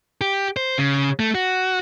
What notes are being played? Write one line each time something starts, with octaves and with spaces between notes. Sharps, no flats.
G4
C5
C#3
A3
F#4